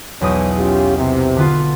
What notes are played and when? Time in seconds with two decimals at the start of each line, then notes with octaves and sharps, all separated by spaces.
0.21 B1 E2 B2 C#5 D#6
0.59 C#4 F4 G4
0.97 C3
1.37 D3 B3 F4